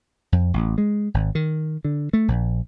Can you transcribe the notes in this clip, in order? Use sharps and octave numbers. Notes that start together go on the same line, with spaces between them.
F2
A1
G#3
G#1
D#3
D3
A3
A#1